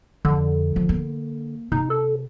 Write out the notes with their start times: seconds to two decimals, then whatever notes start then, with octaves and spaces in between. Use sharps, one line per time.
0.25 F2 D3
0.76 F3
0.89 A#3
1.72 C3 D#4
1.90 A4